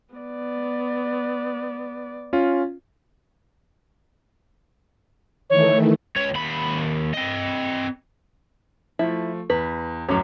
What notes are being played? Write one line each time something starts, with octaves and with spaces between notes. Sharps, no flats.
B3 D5
C#4 F4
D#3 E3 A3 C#5
C#2 C#5
D#2 B5
C4 D#5
F3 A3 E4
E2 B4
D1 F#2 F#3 C#4 D6